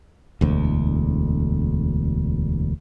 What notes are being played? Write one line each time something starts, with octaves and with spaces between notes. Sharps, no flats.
E1 D2